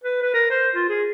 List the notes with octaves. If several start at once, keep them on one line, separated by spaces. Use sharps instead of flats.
B4
B4
A#4
C5
F4
G#4